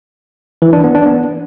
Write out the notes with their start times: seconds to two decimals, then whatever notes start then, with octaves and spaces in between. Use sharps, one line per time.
0.62 E3
0.73 D4
0.84 B3
0.95 D4
1.06 B3